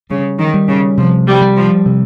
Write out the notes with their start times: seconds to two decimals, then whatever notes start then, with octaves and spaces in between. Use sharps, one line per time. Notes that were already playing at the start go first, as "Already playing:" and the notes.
0.10 C#3 G3
0.40 D#3
0.54 G3
0.68 C#3
0.97 C3 F3
1.27 G3
1.42 G3
1.56 F3
1.86 C3